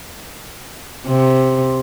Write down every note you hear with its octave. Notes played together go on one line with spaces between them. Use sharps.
C3